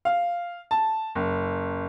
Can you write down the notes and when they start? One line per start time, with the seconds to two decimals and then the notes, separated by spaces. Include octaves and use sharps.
0.05 F5
0.71 A5
1.15 F#1